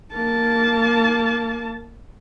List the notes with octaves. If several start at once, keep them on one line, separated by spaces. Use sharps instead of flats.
A#3 A5